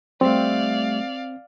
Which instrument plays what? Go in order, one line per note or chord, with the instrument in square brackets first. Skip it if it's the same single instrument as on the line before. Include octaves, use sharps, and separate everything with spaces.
[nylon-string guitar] G3 A3 [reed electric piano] C4 [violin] D5 F5